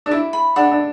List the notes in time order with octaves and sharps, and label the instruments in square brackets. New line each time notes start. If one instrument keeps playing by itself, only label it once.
[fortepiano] D4
[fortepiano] E4 [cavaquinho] D6
[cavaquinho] B5
[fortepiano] D4 [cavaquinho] F#5
[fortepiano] D4